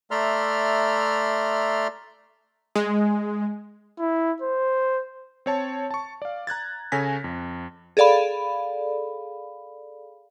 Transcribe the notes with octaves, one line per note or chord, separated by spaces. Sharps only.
A3 D5 E5 A#5 C6 F6
G#3
E4
C5
C4 C#5 A5
A5 C#6
D5 F5
A#5 F#6 G#6 A6
C#3 A4 C#5 G#5 A#6 B6
F2
G#4 A4 D5 F5 B5